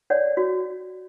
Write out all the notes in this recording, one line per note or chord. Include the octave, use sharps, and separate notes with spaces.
C#5 D5 F#5
F#4